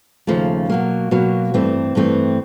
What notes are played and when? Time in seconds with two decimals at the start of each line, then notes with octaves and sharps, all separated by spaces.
0.27 D#2 C#3 F3 A3
0.70 B2 F#3 A#3
1.11 B2 F#3 A#3
1.54 G2 E3 A3 C4
1.95 G2 E3 A3 C4